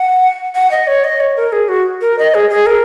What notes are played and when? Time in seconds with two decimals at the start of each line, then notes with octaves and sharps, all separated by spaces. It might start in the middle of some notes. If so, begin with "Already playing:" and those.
Already playing: F#5
0.55 F#5
0.71 D#5
0.87 C#5
1.04 D#5
1.20 C#5
1.37 A#4
1.52 G#4
1.69 F#4
2.01 A#4
2.19 D#5
2.34 G#4
2.50 G#4
2.66 A#4